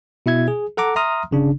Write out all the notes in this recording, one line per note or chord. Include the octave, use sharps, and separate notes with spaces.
B2 E4 E5 G#6
G#4
A4 F#5 A#5 D6
E5 A#5 C6 D#6 F6
G1 C#3 D4